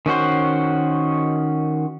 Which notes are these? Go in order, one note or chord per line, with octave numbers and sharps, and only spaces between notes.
D#3 C#4 F#4 C5